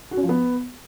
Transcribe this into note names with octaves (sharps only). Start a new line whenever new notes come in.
F#4
C#4
F3
B3